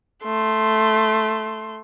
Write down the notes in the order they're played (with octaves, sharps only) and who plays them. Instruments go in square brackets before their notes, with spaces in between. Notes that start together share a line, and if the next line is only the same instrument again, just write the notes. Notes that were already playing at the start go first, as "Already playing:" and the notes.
[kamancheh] A3 C6